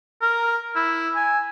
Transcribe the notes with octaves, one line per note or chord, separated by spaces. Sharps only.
A#4
E4
G#5